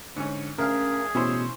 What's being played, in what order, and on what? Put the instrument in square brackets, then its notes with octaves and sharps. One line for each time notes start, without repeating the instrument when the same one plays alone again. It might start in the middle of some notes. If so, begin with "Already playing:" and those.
[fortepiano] G#2 C#4 [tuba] D3
[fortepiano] D2 F6 [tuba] C#4 [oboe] G#4 [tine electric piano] A#4 F5
[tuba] A1 [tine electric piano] B2 [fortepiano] C#4 E4 C5